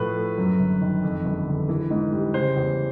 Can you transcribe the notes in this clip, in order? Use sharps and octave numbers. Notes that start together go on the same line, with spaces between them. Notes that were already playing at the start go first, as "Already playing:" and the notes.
Already playing: A2 F3 B4
A3
F#2
G1
D#3
F2
G1
D3
E3
G#2
G3
C#3 C5
E2